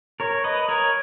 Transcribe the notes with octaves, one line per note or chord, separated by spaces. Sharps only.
A#4 C#5
B4 D#5
A#4 C#5